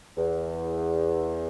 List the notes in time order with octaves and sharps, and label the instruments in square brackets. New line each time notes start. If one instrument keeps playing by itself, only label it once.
[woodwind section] E2